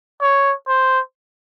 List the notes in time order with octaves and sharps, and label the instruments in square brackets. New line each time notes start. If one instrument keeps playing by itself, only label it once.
[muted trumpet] C#5
C5